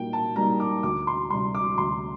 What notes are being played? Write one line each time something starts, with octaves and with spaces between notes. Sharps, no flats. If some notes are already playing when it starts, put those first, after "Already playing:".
Already playing: A#2 G3 A#3 D#4 G5
A5
G3 A#3 D#4 A#5
D6
D2 D6
C6
C3 G3 C6
D6
D2 C6